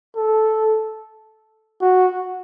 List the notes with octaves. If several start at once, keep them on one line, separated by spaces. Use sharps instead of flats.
A4
F#4